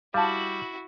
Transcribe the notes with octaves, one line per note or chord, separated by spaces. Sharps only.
G3 E4 F#4 F5 A5